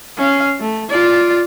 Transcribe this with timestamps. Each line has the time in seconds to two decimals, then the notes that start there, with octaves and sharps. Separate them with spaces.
0.18 C#4 F5
0.60 A3
0.90 F4 D5